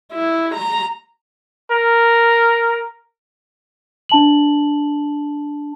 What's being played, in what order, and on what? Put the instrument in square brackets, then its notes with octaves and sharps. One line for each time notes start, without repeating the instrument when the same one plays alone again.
[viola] E4
A#5
[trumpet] A#4
[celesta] D4 A5 F#7